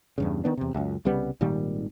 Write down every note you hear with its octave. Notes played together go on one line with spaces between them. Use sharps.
E2 G2 C#3
D#3 B3 D4
E2 C3
C#2 F#2
C2 C#3 G3 B3
G#1 A#2 D#3 G3